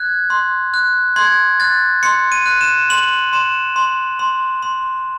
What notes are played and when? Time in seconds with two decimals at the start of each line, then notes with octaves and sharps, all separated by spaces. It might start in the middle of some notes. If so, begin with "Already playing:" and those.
Already playing: F#6 G#6
0.30 C6
0.74 F#6
1.16 C6 G#6
1.60 F#6 A6
2.03 C6 C#7
2.32 D#7
2.46 F#6
2.61 E7
2.90 C6 F#7
3.33 C6 E7
3.76 C6
4.19 C6
4.62 C6